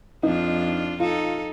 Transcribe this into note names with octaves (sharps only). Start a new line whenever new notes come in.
F2 D4 D#4 F4
D#4 F4 A4